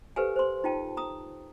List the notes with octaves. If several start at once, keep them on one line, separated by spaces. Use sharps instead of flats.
G4 A4 B4 C5 F5 G#5
C5 C6
D#4 F4 G5 A5
A#5 D#6